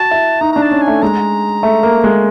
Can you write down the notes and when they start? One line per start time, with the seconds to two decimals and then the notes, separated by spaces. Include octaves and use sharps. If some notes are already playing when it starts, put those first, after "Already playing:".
Already playing: F#4 A5
0.11 E4
0.41 D#4 A#5
0.53 D4 A#5
0.62 A5
0.71 C#4
0.82 G#5
0.87 A3
1.02 G#3 A#5
1.63 A3
1.83 A#3
2.04 G#3